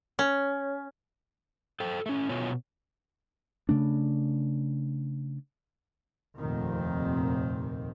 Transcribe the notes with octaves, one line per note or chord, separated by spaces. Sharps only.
C#4
A4 C5 G5
A3 C#4
B2 B3 F4 C#5 G#5
C#3 A3 D4
F1 D#2 A#2 D#3 C4